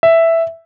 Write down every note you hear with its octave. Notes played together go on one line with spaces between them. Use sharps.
E5